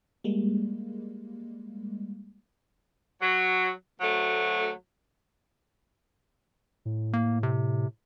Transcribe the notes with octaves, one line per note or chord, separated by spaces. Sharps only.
G3 G#3 A#3
F#3
D2 F#3 A3
A2
A#3
C3